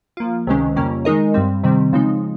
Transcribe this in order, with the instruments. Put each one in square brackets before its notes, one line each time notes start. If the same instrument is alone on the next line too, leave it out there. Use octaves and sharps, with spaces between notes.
[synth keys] F3 A#3 F4
C#2 C3 D#3 G#3 C#4
F2 C#3 G3 A#3 C#4
D#3 G#3 D#4 A#4 D#5
G2 G3 C4
C3 D#3 G3 C4
C#3 F3 G#3 C4 D#4